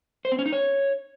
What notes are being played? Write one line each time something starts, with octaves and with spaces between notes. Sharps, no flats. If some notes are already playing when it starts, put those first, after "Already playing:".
C5
C4
C#4
D#4
C#5